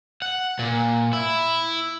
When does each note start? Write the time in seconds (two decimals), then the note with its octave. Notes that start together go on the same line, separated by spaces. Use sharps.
0.22 F#5
0.59 A#2
1.13 E4